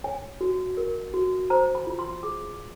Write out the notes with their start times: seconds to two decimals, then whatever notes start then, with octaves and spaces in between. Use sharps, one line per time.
0.04 C#5 G#5
0.41 F#4
0.77 A#4
1.14 F#4
1.50 C5 A#5
1.75 B5
1.87 F4
1.99 C6
2.23 G#4 D6